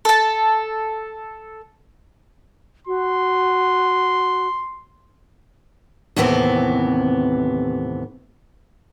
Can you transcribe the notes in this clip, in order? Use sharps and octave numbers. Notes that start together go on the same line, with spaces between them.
A4 A5
F#4 C6
D#2 A2 C3 E3 B3 C4